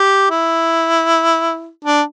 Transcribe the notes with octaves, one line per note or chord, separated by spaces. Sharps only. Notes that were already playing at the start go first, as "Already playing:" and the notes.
Already playing: G4
E4
D4